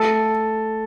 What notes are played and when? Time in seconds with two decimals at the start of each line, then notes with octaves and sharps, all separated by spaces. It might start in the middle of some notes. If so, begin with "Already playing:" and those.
Already playing: A3 A4